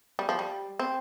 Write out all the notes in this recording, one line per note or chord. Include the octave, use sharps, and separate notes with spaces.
G3
F3
G3
C4